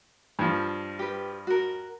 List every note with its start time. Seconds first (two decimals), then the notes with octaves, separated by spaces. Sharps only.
0.39 G2 F3
0.99 G4 B4
1.47 F#4 A#4